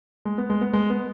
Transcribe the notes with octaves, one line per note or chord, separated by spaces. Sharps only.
G#3
B3
G#3
B3
G#3
B3